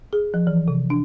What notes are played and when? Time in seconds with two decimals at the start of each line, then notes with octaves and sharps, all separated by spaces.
0.13 G#4
0.34 F3
0.47 E3
0.68 C3
0.90 D4